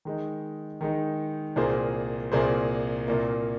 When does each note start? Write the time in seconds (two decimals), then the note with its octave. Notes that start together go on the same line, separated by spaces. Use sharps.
0.05 D#3 G#3 D#4
0.81 D#3 G#3 D#4
1.56 C2 A#2 A#3 G#4 C5
2.32 C2 A#2 A#3 G#4 C5
3.08 C2 A#2 A#3